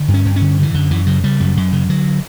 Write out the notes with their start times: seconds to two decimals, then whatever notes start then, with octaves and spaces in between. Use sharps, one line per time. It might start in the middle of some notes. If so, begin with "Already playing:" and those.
Already playing: D3
0.08 G2
0.14 C#4
0.25 G2
0.36 C#4
0.41 D3
0.58 C#3
0.63 E3
0.74 F#2 D3
0.91 F#2 E3
1.07 C#3 F#3
1.24 C#3 G3
1.40 F#2
1.57 F#2
1.72 C#3
1.89 D3 F#3